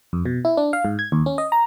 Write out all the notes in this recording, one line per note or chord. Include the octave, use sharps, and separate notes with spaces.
F2
B2
E4
D4
F5
G#2
G#6
D#2
C#4
D#5
A#5